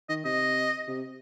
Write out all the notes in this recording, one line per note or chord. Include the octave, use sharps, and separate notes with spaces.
D#3 D#5
C3 D#5
C3